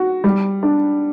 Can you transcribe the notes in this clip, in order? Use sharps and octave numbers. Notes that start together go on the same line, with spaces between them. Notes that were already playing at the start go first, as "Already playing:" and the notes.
Already playing: F#4
G3
D4